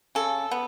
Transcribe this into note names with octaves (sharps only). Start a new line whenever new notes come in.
C#3 A4
B3